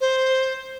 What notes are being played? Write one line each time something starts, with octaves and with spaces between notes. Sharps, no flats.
C5